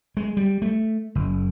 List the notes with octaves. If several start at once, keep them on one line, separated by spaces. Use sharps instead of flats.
G#3
G3
A3
F#1